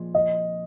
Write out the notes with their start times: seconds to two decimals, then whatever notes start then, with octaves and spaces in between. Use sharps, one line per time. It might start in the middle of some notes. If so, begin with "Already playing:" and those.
Already playing: A#2 F3 G#3
0.14 D#5